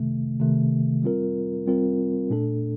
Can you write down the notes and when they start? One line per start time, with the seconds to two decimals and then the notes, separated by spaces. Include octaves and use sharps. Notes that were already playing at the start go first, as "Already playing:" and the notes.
Already playing: C3 D#3 A3
0.40 C3 D#3 A3
1.03 G3 C4 F4 A#4
1.67 G3 C4 F4 A#4
2.30 A#2 A3 D4 A4